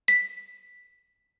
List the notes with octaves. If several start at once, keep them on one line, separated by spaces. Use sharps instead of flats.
B6